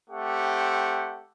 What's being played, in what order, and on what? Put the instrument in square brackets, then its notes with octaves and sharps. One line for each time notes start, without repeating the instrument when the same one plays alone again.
[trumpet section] A3 C4 G4 F#5